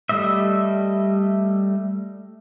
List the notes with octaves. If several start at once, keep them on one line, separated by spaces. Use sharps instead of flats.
G3 A3 D#5 E5